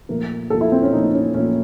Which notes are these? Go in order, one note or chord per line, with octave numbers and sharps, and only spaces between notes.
A#2 F3 A3 A#4
A#2 F3 A3 A4
E4
C4
C#4
A#2 F3 A3 D#4
C#4
A#2 F3 A3 C#4